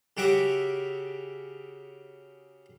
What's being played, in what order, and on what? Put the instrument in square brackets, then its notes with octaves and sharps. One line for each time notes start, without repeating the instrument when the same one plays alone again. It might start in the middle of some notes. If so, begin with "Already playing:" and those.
[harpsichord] C#3 F#4 G4 E5 D6